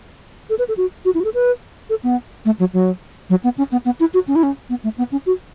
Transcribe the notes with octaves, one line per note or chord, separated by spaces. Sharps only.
A4
B4
A4
F#4
F#4
E4
F#4
A4
B4
A4
B3
A3
F#3
F#3
F#3
B3
C#4
B3
B3
E4
F#4
C#4
E4
C#4
B3
A3
B3
C#4
F#4